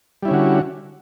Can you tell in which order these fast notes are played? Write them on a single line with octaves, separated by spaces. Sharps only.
G3 E4 C#4 D3 F#4